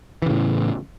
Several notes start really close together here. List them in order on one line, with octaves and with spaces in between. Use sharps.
E3 C#3 A2